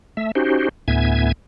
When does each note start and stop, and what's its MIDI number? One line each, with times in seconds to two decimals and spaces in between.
0.17 0.31 57
0.17 0.31 76
0.35 0.69 61
0.35 0.69 63
0.35 0.69 66
0.35 0.69 67
0.35 0.69 72
0.88 1.32 38
0.88 1.32 45
0.88 1.32 59
0.88 1.32 76
0.88 1.32 80
0.88 1.32 92